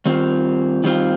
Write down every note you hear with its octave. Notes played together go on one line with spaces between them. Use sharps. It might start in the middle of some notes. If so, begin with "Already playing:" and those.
D#3 G3 C4 F4
D#3 G3 C4 F4